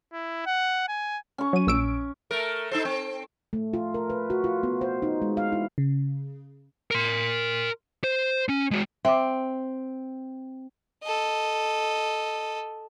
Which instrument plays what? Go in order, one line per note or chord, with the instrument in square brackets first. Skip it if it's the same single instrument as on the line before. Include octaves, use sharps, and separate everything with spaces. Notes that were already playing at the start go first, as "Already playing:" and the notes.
[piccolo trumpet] E4
F#5
G#5
[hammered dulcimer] C#4 C#6
[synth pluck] F#3 D#7
A#1 E6 D7
[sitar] A3 A#4
D#4 A4 C5
C4
[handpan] A3
F4
A#4
B4
F#4
F4
B3
C5
D#4
G#3
F5
E4
[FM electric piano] C#3
[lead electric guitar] A#4 C6
C5
C#4
G#3 F#4
[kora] C4 [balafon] E5 D6
[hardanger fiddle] A4 D#5